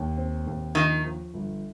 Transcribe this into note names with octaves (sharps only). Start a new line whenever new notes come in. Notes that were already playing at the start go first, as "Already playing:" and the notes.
Already playing: D#2
C4
D#2
D#3 F3
F3
G1